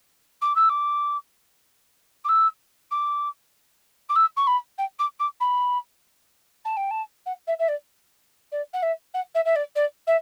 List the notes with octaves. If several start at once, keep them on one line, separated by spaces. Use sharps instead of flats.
D6
E6
D6
D6
E6
D6
D6
E6
C#6
B5
G5
D6
D6
B5
A5
G5
A5
F#5
E5
E5
D5
D5
F#5
E5
F#5
E5
E5
D5
D5
E5